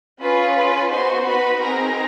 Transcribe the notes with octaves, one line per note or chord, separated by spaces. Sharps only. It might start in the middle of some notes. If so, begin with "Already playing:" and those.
C#4 F4 G#4 B4 B5
B4 B5
B3 D#4 F#4 C5 C6
B4 B5
C4 D#4 G#4 A#4 A#5